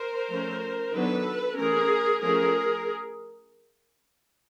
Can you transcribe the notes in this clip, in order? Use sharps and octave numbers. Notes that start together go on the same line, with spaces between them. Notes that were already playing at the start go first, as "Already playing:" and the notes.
Already playing: A#4 C5
F3 A3 C#4
D#3 F#3 B3 D4 A4 B4
E3 A3 C#4 G#4 A#4
F3 A3 C#4 G#4 A#4